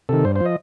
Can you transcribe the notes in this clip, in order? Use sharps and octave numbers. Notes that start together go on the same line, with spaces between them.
C3 D#3 A4
G2 C5
F3 C5
D#5